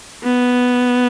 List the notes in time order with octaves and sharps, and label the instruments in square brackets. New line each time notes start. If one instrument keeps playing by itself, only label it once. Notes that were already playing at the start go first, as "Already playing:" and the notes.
[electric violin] B3